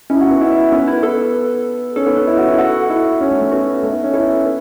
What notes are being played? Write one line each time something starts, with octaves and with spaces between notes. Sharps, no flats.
C#4 E4
F#4
B3
E4
E4
B3 C#4
B3 E4
B3 A4
C#4 A4
B3
C#4
E4
F#4
E4
F#4 A4
E4 A4
C#4
A3
A3
B3 F#4
A3
B3
C#4
E4 A4
B3